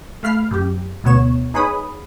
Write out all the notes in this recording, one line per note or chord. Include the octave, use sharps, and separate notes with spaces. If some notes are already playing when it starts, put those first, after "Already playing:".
A3 F5 B5 F6 C7
F#2 G4
D2 B2 B3 C#5 E7
D#4 G#4 B4 C#5 B5 D#6